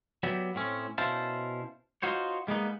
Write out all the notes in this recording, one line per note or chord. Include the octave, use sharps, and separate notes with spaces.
F#3 B3 G4 D5 E5
A2 C4 C#4
B2 C#4 E4 C5 F5 A5
D#4 F4 F#4 C5 C#5
G3 G#3 A#3 B3 D#4